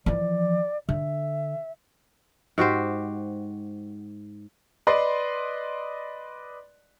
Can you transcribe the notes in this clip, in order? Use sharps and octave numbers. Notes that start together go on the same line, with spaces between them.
E3 F3 D5
D3 E5
G#2 F#4 G4 C5
B4 D5 D#5 C6